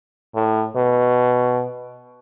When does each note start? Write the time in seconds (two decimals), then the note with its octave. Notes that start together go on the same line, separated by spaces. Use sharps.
0.35 A2
0.76 B2